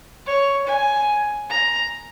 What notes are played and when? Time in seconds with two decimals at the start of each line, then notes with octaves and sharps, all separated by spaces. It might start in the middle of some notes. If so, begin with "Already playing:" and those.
0.26 C#5
0.67 G#5
1.49 A#5